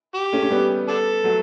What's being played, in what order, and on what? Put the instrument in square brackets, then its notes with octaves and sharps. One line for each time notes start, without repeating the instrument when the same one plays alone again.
[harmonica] G4
[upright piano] A3 C#4
C#4
G3 B3
[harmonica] D4 A4
[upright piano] F#3 A3